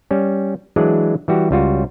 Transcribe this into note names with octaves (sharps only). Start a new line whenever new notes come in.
G3 C#4
E3 F#3 G#3 D4 G#4 D5
E3 G3 F#4 G4
C#2 G3 F4 F#4